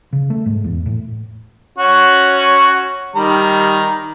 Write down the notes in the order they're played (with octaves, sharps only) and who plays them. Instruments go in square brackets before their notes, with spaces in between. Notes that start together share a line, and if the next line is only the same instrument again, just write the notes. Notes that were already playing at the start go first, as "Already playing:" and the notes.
[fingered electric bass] C#3
A3
G#2
E2
A2
[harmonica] C#4 F#4
D#3 G3 A#5